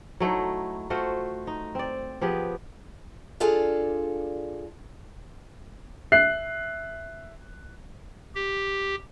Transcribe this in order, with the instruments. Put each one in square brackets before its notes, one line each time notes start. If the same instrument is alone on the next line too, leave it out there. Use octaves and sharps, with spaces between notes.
[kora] F#3 A3 D#4 E4
A3 F4 F#4 C5
D#4
C4 D5
F3 B3 G4 G#4
[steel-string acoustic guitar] D4 F4 G#4 A4 D5 F5
[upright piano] E5 F#6 C7
[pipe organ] G4